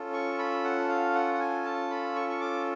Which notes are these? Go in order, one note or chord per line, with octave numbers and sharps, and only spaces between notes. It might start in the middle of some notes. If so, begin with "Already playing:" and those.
Already playing: C#4 F4 A4
C#6
B5
F#5
F5
F#5
F#5
G#5
A5
B5
C#6
C#6
D6